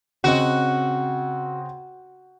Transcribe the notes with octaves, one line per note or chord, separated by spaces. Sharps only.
C#3 C4 F#4 D#5